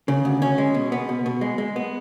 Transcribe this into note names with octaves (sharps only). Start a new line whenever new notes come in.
C#3
D2
C#4
G#3
B2
B3
B2
B2
G#3
G#3
B3